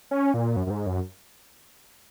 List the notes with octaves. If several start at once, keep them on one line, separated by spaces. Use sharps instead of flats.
C#4
A#2
F#2
F#2
G#2
F#2